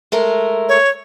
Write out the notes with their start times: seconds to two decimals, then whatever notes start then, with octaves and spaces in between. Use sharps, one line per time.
0.12 G#3 A3 A#4
0.69 C#5